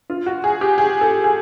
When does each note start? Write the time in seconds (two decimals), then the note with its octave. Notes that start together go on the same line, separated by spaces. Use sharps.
0.10 F4
0.26 F#4
0.44 G#4
0.61 G4
0.78 G#4
1.01 A4
1.24 G#4